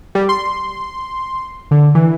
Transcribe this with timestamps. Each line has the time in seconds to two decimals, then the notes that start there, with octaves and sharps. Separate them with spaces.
0.15 G3
0.29 C6
1.71 D3
1.95 E3